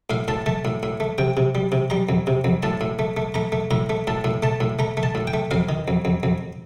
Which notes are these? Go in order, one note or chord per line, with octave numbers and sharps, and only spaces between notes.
A2 F5
A2 A5
A3 A5
A2
A2
A3
C3 G5
C3
G3
C3
G3 A#5
F2
C3
F2
A2 A5
A2
A3
A3
A3 A#5
A3
A2 A#5
A3
A2 A5
A2
A3 A5
A2
A3 A#5
A3
A5
A2
G5
A3
F2 F5
D#3
F2
F2
F2